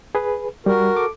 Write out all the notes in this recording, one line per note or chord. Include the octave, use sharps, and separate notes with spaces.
G#4 B4
G3 F#4 A#4
A4 D6